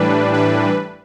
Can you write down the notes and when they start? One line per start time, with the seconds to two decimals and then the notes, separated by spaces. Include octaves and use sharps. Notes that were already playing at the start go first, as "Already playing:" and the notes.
Already playing: A2 E3 G3 D4 B4
0.33 B4